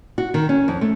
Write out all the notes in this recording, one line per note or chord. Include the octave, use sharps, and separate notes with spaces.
F#4
D#3
C#4
F2
A3